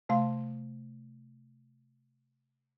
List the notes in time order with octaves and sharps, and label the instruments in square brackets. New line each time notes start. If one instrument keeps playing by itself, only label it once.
[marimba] C3 A3 F5 C6